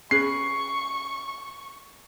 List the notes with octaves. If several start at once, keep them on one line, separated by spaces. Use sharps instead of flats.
C#4 G#4 B4 C#6 C7